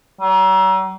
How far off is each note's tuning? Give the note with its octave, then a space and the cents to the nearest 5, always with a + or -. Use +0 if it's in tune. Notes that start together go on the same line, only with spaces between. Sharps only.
F#3 +45